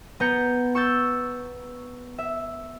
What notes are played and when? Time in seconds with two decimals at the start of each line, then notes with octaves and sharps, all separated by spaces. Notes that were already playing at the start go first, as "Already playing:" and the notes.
0.20 B3 A#5 G6 C#7
0.75 C#6 E6 G6 A6
2.18 E5